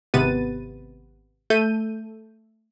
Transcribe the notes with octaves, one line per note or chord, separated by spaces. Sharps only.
G#1 C3 B3 B4 A6 D#7
A3 A4 G6 D#7